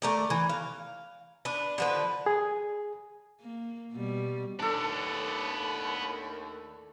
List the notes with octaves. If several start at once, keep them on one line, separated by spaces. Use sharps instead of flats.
A3 A#4 D5
E3
F5
D4 B4
D3 F3 B4
G#4
A#3
B2 G3
D#2 A2 B3 D4 A4 A#4 D5